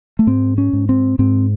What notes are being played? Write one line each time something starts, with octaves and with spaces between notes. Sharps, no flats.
A3
G#2 C4
C#4
G#2
C4
G#2 C4